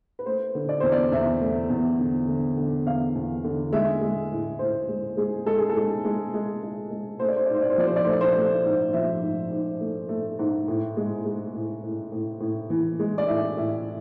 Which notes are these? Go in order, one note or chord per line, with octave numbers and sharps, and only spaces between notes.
B4
A3 C5
D3
D5
E2 C5
D5
E2 E5
A3
E2
D3
D3
D3
E2 F5
E2
D3
G#3 E5
G#3
A2
A2 C5
G#3
G#3 G#4
G#3 A4
G#4
A4
G#3
G#3
G#3
G#3
G#3
A3 C5
D5
C5
D5
G#2 C5
D5
C5
F3 D5
C5
D5
A3 C5
D5
C5
A3
G#2
F3 E5
G#2
G#2
A3
A3
G#2
A2
G#3
G#3
A2
A2
A2
A2
E3
G#3
D5
A2 E5
A2 E5